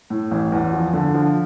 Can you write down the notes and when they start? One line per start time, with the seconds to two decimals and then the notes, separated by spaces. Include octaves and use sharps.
0.10 A2
0.31 A1
0.52 E2
0.73 F3
0.93 D3
1.14 F3